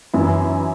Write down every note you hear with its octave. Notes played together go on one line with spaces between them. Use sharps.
F#2 E3 E4